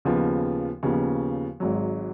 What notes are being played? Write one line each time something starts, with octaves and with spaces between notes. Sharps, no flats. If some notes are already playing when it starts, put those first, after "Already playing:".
D#2 C#3 F3 B3
D#2 C#3 F3 B3
G#1 G#2 F#3